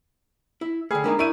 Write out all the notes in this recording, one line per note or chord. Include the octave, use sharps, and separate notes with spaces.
E4
D3 A3 G#4 G5 B5 F6
G#3 A#3 D4 D#4 A#4 A#5
E4 A#4 D5 C#6 G6 D#7